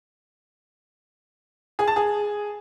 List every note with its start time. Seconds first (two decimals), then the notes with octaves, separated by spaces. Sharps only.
1.79 G#4
1.88 A5
1.96 G#4